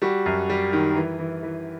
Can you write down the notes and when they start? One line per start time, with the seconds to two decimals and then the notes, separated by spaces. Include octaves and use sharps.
0.02 G3 F#4
0.26 F#2
0.49 G3
0.73 D#3
0.96 E3
1.19 E3
1.43 E3